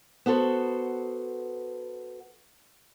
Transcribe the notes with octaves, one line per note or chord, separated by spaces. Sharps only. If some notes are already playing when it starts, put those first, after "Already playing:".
B3 F#4 A4 C5